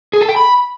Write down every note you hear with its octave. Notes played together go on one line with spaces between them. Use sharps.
G#4
A4
G5
B5